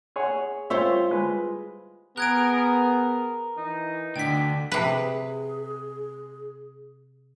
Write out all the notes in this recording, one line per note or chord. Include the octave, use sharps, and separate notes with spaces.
G#4 C#5 F#5
G3 F4 C5 C#5 E5
G#3 B4
B3 G#4 A#4 F#6 G#6 D7
E3 D#4
D2 D3 D4 G5 B6
C3 G#4 B4